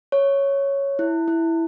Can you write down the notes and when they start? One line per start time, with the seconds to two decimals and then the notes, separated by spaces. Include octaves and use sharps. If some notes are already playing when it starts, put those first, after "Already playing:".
0.12 C#5
0.99 E4
1.28 E4